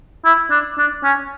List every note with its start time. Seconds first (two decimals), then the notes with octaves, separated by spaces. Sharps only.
0.25 E4
0.51 D4
0.78 D4
1.04 C#4